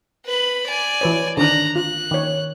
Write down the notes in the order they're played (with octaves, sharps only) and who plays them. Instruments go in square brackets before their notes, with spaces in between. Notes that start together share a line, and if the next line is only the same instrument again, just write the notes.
[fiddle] B4 B5
D5 G#5
[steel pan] E3 B4 C#5
[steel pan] D3 D#3 D4 [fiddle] A#5 F#6
[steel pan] F4 [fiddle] F#6
[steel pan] D#3 C#5